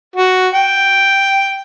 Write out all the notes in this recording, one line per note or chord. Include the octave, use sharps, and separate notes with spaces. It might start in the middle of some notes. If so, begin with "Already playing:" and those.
F#4
G5